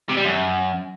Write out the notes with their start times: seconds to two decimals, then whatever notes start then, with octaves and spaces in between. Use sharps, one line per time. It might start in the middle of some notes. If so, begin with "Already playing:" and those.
0.09 C3
0.17 G3
0.25 F#2